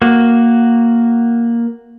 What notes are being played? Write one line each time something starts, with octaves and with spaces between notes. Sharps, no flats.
A#3 F#4